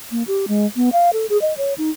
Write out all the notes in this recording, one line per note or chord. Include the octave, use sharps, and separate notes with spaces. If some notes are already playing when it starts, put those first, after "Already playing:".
A#3
G4
G#3
B3
F5
A4
G#4
D#5
C#5
D#4